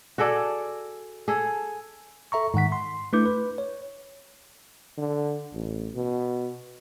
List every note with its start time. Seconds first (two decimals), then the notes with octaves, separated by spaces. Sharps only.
0.18 F#4 G#4 A4 D5
1.28 G#4 A4
2.32 A4 E5 A#5 C#6
2.54 G#2 D#3 F#5 B6
2.72 C6
3.13 A3 D4 E4 B4 D6 G6
3.25 B4
3.58 C#5
4.98 D3
5.54 A1
5.94 B2